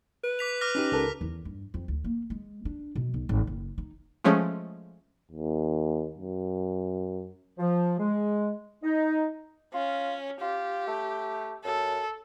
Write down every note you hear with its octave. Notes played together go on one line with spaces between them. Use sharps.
B4
D6 B6 F7
D6 F6 A#6
C#4 D#4 G4
C#2 A4 A#4
E2
G2
F2
D2
A#3
G#3
D4
B2
B1
G#1
F#1
D#4
F3 G#3 A3 C#4
D#2
F#2
F3
G#3
D#4
C#4 F4
F4 G4
A3
F#2 A4